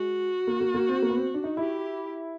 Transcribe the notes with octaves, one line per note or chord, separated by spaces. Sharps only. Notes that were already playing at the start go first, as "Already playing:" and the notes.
Already playing: G#3 F#4
A#3
A#3
A#3
C4
A#3
B3
C4
D4
D#4
E4 G4